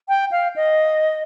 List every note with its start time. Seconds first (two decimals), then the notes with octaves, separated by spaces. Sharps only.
0.08 G5
0.31 F5
0.56 D#5